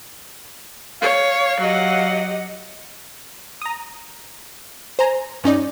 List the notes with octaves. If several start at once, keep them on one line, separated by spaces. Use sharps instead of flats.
C#5 F5
F#3 G4 D#5 F#5
A#5 D#6
C5 G#5 A#5
G2 C#4 D#4 D5